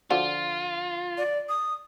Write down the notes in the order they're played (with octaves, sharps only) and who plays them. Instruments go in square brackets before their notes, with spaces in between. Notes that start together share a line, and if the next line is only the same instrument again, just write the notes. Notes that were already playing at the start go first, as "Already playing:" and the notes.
[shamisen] D3 F3 F#4 [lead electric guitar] F4
[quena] D5
D#6